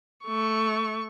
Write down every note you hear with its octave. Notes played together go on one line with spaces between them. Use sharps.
A3 C#6